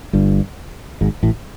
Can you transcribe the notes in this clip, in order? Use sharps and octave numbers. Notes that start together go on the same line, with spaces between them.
G1 G2
G#1 G#2
A1 A2